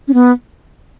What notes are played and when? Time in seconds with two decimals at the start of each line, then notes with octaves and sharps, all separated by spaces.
0.08 C#4
0.14 B3